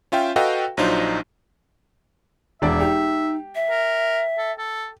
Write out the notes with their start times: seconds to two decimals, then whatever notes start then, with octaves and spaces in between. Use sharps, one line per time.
0.12 C#4 F4 E5 G5
0.36 F#4 A4 B4 D#5 F5 G5
0.77 A#1 F#3 D4 D#4 F4 C5
2.62 E1 D4 D5 E5
2.81 D#4 G4
3.55 E5
3.70 A#4
4.38 A4
4.58 A4